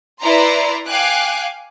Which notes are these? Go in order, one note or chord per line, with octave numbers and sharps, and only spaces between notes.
E4 B4 D5 A#5 C6
F5 G5 G#5 D6 F#6